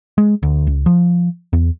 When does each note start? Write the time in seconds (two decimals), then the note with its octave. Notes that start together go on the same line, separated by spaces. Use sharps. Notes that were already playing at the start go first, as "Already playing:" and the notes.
0.18 G#3
0.43 D2
0.67 C#2
0.86 F3
1.53 E2